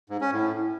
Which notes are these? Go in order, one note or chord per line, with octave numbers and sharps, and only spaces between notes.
G#2
C#4
A2